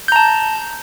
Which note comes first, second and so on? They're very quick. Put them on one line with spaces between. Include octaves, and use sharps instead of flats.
G6 A#5 A5